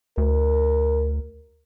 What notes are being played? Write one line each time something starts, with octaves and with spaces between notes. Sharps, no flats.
D2 A#4